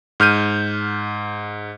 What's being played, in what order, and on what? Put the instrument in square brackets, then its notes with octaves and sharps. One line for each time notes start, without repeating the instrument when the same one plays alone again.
[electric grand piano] G#2 F6 G6 D#7